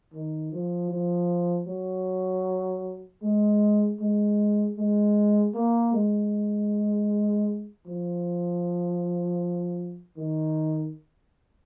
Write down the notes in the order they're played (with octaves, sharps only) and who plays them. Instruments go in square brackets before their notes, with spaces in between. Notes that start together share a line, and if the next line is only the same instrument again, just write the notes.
[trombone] D#3
F3
F3
F#3
G#3
G#3
G#3
A#3
G#3
F3
D#3